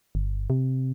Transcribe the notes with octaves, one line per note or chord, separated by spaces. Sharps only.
G1
C3